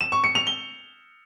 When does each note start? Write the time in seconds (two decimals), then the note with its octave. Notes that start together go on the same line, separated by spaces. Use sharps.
0.01 E7
0.12 C#6
0.24 C#7
0.35 F7
0.47 G7